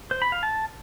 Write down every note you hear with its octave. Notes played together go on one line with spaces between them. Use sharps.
C5
B5
F5
A5